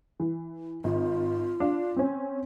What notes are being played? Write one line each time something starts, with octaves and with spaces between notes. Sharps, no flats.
E3
G#1 F4
D4 F5
C4 C#4